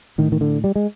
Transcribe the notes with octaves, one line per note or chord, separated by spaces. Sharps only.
A2 D#3
D#3
D3
G3
G#3